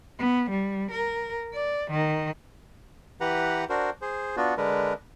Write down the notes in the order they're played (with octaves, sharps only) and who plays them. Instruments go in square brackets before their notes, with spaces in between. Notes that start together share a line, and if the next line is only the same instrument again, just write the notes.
[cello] B3
G3
A#4
D5
D#3
[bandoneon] E3 G4 B4 F#5 A#5
D4 F#4 A#4 C5
G#4 C5
B3 D4 F4 F#4
D3 G#3 D4 A#4 B4